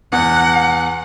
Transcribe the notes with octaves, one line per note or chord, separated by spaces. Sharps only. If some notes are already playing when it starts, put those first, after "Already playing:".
E2 F#5